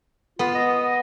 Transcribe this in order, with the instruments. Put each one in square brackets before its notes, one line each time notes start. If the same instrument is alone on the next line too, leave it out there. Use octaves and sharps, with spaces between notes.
[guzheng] B3 [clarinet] F4
[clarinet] D#5